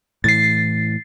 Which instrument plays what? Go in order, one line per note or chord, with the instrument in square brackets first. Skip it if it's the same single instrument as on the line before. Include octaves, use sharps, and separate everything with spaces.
[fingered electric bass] A2 E3 [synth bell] A6 C7